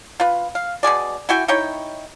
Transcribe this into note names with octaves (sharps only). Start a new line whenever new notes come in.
F4 B4
F5
B2 G#3 G#4 D5
E4 F#4 G5 G#5
D#4 E4 C#5 G5